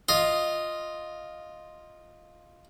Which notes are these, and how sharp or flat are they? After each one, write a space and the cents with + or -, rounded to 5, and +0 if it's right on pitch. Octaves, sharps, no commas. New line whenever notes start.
F4 +0 D#5 +0